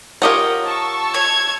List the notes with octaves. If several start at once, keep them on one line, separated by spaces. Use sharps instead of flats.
F4 G4 A#4 C#5 D#5 F#5
A5 C#6 E6
C#5 G#6